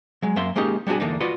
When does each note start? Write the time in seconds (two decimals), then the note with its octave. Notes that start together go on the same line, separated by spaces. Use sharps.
0.22 F#3 G#3
0.36 F#2 A#3 E5 C6
0.56 G#3 A#3 C#4 D#4 G4
0.87 G3 B3 D4 F#4 G#4
1.00 E2 D3 A#3 D4 D#4
1.20 F4 F#4 B4 D5 D#5